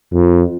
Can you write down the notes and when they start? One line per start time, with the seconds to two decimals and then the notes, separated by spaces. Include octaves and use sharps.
0.13 F2